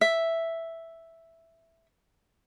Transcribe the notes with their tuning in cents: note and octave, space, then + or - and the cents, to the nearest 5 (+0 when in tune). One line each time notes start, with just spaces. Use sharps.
E5 +0